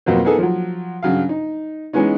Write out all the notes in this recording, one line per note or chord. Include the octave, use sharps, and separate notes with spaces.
F2 B2 F#3 A#3 C4
A#3 B3 D#4 G#4 A4
F3 F#3
G2 C#3 F#3 F5
D#4
E3 G#3 B3 C#4 D#4